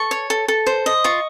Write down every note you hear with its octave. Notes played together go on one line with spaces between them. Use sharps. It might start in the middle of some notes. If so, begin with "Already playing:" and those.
Already playing: A4 C#6
C#5
A4
A4
C5
D#5
F4 C#6